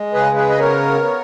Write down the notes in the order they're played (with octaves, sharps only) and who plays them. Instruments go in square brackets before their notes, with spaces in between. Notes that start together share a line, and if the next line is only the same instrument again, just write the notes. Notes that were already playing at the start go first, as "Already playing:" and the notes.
Already playing: [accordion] G#3
C#3 G#4 B4
G#4 B4
D#5
B3 A#4 C#5
B3